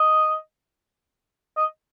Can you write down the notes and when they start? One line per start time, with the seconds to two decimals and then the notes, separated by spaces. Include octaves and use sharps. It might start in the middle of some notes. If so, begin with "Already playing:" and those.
Already playing: D#5
1.57 D#5